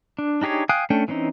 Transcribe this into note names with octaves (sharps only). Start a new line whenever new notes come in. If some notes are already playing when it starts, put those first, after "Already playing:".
D4
D4 D#4 G4 G#4 C#5
F5 G5 G#5 D#6 F#6
A3 C#4 D4 G5
E3 C4 C#4 D#4